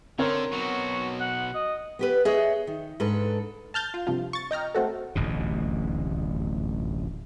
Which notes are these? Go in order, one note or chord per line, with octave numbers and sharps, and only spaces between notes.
D3 C4 A#4 C#5
B2 F#3 F#4
F#5
D#5
B3 G4 B4
G#4 C#5 D#5 E5
D#3
G#2 D4 A4 B4
A5 F6 G6 A6
F4
G2 C3 F3 F4
C#6 A6
D#5 G5 A#5 F6
A3 C4 F#4 A4
D1 A1 D#2 B2